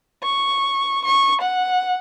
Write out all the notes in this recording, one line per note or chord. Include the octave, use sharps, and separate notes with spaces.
C#6
C#6
F#5